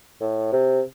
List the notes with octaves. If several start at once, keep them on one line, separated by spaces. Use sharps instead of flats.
A2
C3